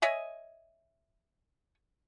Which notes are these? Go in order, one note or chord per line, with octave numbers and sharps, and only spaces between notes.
C#5 D#5 E5 G#5